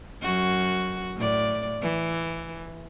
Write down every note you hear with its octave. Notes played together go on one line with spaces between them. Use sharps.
F#2 F#4
A2 D5
E3